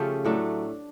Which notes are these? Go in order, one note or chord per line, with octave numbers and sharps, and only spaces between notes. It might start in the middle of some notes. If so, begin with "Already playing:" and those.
Already playing: C#3 F3 A3 C#4 G4
A2 F#3 A3 D4